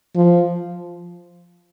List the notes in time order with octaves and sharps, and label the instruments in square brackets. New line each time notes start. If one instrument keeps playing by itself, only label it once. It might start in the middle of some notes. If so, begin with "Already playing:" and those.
[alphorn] F3